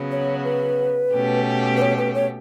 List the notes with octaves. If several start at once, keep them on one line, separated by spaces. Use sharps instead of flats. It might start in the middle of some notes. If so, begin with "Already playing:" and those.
Already playing: C#3 F#3 B3 F#4
C#5
B4
B2 A3 C#4 G4
B4
C#5
B4
C#5